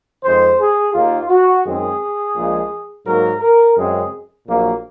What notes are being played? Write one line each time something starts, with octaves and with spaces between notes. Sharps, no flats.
F2 D#3 G#3 C5
G#4
D#2 D#3 A#3 F4
F#4
F#2 D#3 G#3 C4 G#4
A#1 A#2 F3 G#3
G#2 F#3 A#3 A#4
A#4
F#2 C#3 G#3 C4 G#4
A#1 A#2 F#3 A#3